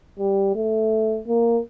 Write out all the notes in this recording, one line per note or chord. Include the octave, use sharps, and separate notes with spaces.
G3
A3
A#3